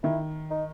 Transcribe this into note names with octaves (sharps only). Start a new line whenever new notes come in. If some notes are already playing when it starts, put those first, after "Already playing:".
D#3 E4
D#4